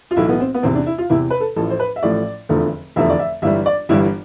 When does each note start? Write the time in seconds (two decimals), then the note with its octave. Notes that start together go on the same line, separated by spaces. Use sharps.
0.11 F4
0.16 B1 A2 E3 A3 E4
0.29 B3
0.40 C4
0.54 B3
0.63 E2 C3 E3 C4
0.75 D4
0.86 E4
0.98 F4
1.10 E2 C3 E3 E4
1.30 B4
1.40 A4
1.56 A1 A2 F3 A3 A4
1.70 C5
1.80 B4
1.96 E5
2.03 A1 A2 F3 A3 D5
2.49 F1 E2 D3 F3 A3
2.96 F1 E2 D3 F3 A3 E5
3.10 D5
3.19 E5
3.42 G1 G2 E3 G3 E5
3.66 D5
3.89 G1 G2 E3 G3 E4